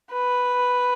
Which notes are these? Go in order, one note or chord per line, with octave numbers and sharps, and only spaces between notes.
B4